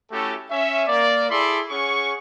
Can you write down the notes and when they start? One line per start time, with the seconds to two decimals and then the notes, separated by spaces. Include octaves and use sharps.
0.12 A3 C#4 E4 F#4 G4 A4
0.51 C#4 E5
0.87 A#3 D5
1.30 E4 G#4 A4 B5 C6 D6
1.70 C#4 G#4 F#5 C#6